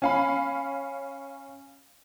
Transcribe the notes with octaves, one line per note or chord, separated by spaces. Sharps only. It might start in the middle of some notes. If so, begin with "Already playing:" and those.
C#4 F5 B5